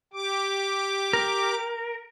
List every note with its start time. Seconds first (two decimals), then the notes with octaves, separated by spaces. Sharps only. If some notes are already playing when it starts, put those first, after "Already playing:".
0.13 G4 D6
1.13 A#4